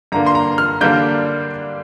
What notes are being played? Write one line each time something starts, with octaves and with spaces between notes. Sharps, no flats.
G2 D3 A#3 A#5
C6
A#5
F6
D3 G3 A#3 D4 G6